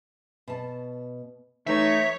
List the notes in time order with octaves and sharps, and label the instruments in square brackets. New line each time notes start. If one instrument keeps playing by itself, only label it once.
[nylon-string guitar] B2 A5
[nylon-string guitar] E3 [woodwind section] A3 D#4 [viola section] C#5 [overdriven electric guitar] E5